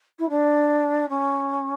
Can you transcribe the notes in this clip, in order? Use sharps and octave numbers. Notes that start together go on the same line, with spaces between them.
E4
D4
C#4